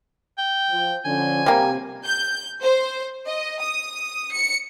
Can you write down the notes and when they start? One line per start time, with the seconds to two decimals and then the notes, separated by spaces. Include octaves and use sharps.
0.38 G5
0.70 F3
1.05 D3 F3 C#4 G#5
1.46 C3 G3 A#3
2.05 G6
2.63 C5
3.27 D#5
3.60 D#6
4.32 C#7